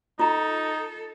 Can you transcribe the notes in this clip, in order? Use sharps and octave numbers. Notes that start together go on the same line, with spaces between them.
D#4 F4 A4 A#5